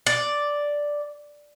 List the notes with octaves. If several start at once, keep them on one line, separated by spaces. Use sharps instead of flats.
D5